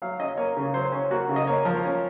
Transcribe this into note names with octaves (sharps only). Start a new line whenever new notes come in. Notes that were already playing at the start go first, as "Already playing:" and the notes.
F#3 F5
C#4 D#5
A#3 C#5
C#3
F#3 C5
C#4
A#3 F#4
C#3
D#5
A#3 C#5
F3 A#4
C#4